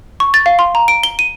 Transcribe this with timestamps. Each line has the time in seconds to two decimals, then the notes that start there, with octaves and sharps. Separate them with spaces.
0.20 C#6
0.34 A6
0.46 F5
0.59 C6
0.75 A#5
0.88 D7
1.03 G7
1.19 D#7